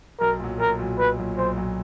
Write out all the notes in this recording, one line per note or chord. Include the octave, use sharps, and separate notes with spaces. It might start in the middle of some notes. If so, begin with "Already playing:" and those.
B1 A#4
A#2 F#3
B1 A#4
A#2 F#3
B1 B4
A#2 F#3
B1 C5
A#2 F#3